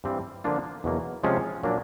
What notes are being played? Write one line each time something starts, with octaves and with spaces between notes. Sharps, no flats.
G2 E3 G3 C4
D3 F3 A#3 D4 F4
E2 B2 F#3 A#3
C3 F3 G#3 C#4 F4
A#2 F#3 A#3 D4